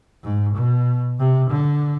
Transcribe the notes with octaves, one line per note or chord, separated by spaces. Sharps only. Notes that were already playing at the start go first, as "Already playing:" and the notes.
G#2
B2
C3
D3